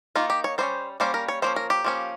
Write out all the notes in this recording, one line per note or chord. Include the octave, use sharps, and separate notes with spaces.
D#3 A#3 D#4 F4
G4
C#5
G3 A#3 C#4 C5
G3 A#3 C#4 C5
A#4
C#5
F3 A#3 C#4 C5
A#4
G4
F3 A#3 C#4